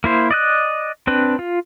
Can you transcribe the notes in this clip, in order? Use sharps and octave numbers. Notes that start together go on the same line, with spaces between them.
A#3 E4 C5
D5 D#5 F#6
C4 D4 B4
F4